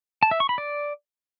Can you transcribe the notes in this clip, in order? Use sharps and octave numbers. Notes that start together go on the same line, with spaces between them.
A5
E5
C#6
B5
D5